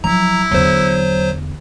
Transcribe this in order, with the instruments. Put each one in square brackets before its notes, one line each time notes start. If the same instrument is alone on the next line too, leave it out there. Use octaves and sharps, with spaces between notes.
[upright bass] F3 F#3 [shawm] E4 [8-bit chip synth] A#5
[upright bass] E2 D3 [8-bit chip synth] F#3 C5